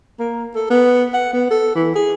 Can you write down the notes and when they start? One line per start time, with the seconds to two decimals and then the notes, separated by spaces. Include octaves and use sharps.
0.19 A#3
0.55 A4
0.70 B3
1.14 F#5
1.33 B3
1.51 A4
1.75 E3
1.95 G#4